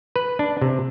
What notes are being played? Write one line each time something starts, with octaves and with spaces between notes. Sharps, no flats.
B4
D4
C3